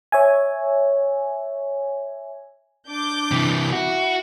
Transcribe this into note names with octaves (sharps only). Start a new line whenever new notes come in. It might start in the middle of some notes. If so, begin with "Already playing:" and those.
C#5 E5 G#5
D4 D6 G6
C3 E3
E4 F#4